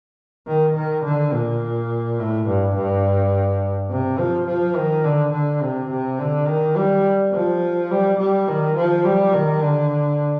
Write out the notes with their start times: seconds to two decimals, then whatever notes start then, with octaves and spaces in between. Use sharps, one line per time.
0.47 D#3
0.76 D#3
1.05 D3
1.33 A#2
2.19 A2
2.47 G2
2.75 G2
3.90 C3
4.19 F3
4.47 F3
4.76 D#3
5.04 D3
5.33 D3
5.62 C3
5.90 C3
6.19 D3
6.48 D#3
6.77 G3
7.33 F3
7.91 G3
8.19 G3
8.48 D#3
8.76 F3
9.05 G3
9.34 D#3
9.62 D3